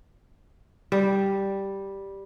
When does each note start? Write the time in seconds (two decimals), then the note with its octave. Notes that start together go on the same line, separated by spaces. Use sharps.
0.92 G3